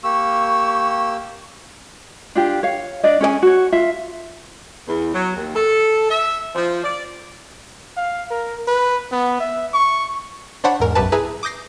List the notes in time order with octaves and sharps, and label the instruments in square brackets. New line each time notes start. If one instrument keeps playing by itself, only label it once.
[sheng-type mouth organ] A#3 G4 E6 [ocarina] C#6
[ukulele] D4 F4 G4
C#5 F5
D4 D5 D#5
C#4 G#4 D5 G#5
F#4 C#5
F4 E5
[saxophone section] E2
F#3
D#2
A4
E5
F3
D5
[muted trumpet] F5
A#4
B4
B3
E5
C#6
[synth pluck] D4 C5 C#5 F#5 B5
E2 G#2 A#4
B1 F#2 G4 B4 A5
E4 G#4 B4 A#5
D6 D#6 G6 A#6 C7